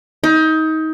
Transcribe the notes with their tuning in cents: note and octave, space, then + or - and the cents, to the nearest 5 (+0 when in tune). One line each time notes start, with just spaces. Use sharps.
D#4 +25